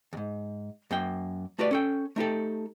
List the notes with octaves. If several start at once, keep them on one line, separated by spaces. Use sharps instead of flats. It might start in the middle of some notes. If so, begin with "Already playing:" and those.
D#2 G#2
F#2 A#3 G5
A3 F#4 G4 B4 D5
C#4 A4 G5
A3 D#4 G4 A4